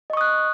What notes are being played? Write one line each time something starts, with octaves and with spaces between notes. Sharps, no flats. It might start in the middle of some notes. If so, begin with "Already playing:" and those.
D#5 C#6 D#6 F#6